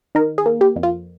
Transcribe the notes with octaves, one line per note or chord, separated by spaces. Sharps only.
D#3 A#4
G#4
A#3
G4
F2
F4